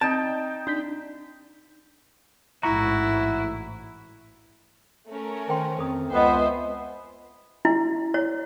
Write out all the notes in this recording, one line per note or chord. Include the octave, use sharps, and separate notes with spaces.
C4 D#4 G5 A5
D4 D#4 G6 B6
A1 G#2 E4 F#4 A#5 C#6
A3 C#4 A#4
D#3 C5 G5 C6
F2 A4 D#6
C#2 B3 C5 D#5 E5 G5 G#5
E4
C#5